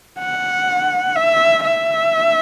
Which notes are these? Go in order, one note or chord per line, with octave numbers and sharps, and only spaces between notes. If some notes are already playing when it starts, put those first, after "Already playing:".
F#5
E5
E5